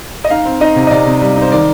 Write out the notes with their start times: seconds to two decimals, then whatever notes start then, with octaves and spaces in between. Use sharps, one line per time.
0.24 D#5
0.30 D#4 F5
0.45 C4
0.61 D#4 D#5
0.76 C3
0.87 D#5
0.91 C3 D5
1.07 C3
1.21 G3
1.37 D#4 C5
1.52 D#3 D5